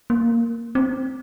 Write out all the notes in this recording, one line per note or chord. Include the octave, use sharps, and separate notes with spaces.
A#3
C4